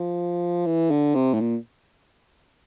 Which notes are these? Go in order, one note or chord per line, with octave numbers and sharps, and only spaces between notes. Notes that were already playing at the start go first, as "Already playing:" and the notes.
Already playing: F3
E3
D3
C3
A2
A#2